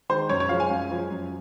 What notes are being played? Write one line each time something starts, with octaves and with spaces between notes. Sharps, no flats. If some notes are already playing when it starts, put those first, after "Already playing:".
D#3 G#3 C5
F#2 C#5
C#5
F3 G#3 F5
G#5
F#2
F3 G#3
F#2